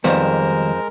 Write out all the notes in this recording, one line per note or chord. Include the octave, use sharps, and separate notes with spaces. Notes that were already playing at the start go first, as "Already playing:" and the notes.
F2 D#3 G3 G#3 B3 A#4 C5